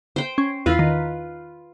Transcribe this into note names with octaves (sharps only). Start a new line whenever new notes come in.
C5 G5
C#4
E2 F4 B4
D#3